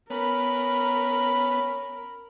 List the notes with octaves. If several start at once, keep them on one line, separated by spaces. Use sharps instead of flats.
B3 C#4 A#4 A#5 B5